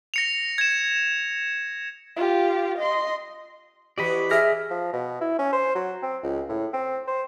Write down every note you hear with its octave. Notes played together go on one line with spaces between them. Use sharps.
A#6 C#7 F7
G#6 E7
F4 G4
D#5 C6
E3 F#4 G4 D5 D#5 B5
G#4 E5 F6 A#6
F3
B2
E4
C#4
C5
F#3
C4
C#2
A2
C4
C5